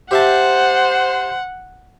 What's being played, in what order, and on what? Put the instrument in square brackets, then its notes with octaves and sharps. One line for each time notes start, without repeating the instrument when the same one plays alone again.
[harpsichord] G4 E5 A5 [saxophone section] C5 [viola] F#5